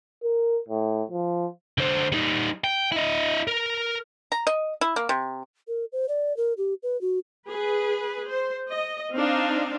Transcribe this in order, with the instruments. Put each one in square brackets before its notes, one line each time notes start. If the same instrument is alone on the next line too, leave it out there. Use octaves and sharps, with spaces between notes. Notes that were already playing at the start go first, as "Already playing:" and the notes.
[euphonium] A#4
A2
F3
[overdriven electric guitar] D3 C5
G3 D#4
G5
E4 D#5
A#4
[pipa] A#5
D#5
E4
A#3
C3
[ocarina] A#4
C5
D5
A#4
G4
B4
F#4
[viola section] G#4 B4
C5
D#5
C4 D4 D#4 F5